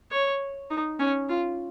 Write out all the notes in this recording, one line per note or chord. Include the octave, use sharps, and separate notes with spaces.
C#5
D#4
C#4
F4